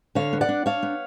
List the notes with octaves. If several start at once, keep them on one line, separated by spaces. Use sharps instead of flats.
D3 C#5 F5
B3
D5 F#5
D4
D4 C#5 F5
B3